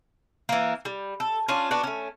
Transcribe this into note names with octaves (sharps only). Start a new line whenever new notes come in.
E3 A#3
G3
A4
C#4 D4 F4
B3 D4 F#4
A3 C#4